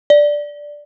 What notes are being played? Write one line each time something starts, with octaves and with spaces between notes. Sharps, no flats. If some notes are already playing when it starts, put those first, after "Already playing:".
D5